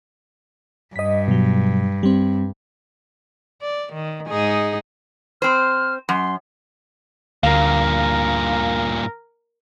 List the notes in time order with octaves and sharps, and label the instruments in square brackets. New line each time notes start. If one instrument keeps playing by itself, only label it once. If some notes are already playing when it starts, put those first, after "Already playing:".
[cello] G2 [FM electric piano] D#5 B6
[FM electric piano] B2 F#3
G3 C4
[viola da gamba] D5
D#3
G#2 D#4 G#4
[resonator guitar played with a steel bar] C4 C5 [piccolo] F6
[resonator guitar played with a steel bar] F#2 [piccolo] C6
[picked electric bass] D2 [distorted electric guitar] G2 A#2 [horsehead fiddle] A#4 [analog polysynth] F5